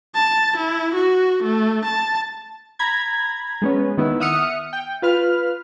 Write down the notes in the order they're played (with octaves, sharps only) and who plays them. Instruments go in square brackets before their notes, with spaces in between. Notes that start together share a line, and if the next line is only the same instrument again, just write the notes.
[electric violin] A5
E4
F#4
A3
A5
[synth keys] A#5 B5 G#6
G#3 B3 C#4
D#3 B3 E4
E5 F#5 D#6 F6 C#7
G5
F4 B4 F6